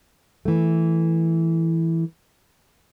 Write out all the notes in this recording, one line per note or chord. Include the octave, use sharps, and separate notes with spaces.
E3 A3